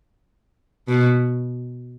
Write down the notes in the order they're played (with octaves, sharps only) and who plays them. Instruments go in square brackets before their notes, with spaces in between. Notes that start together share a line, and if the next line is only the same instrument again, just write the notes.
[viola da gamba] B2